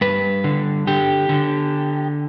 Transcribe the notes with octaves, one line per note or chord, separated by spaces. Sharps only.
G2 B4
D3
D3 G4
D3